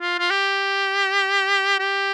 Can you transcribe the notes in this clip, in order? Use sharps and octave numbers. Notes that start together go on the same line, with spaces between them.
F4
F4
G4
G4